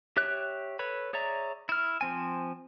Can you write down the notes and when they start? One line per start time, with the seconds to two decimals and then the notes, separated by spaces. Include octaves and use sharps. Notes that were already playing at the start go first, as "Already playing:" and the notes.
0.17 G4 C#5 E5 F#6
0.79 A4 B4 C#5 B5
1.13 G#4 C#5 D5 E5 A#5
1.69 E4 F6
2.01 F3 C4 G#5